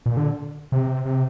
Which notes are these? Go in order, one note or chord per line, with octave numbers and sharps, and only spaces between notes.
A#2
D3
C3
C3